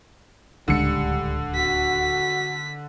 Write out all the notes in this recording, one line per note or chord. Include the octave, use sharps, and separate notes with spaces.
D1 C#2 D3 G3 G#3 C#7
F#4 B6